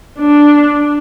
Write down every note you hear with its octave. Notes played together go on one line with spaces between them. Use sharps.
D4